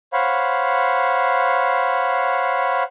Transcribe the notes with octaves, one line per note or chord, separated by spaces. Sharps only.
C5 C#5 F5 F#5 B5